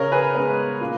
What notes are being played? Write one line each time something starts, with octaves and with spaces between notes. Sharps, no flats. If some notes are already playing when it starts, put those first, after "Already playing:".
Already playing: C#3 A#4 C#5
G#4 B4
G#3 B3
A#2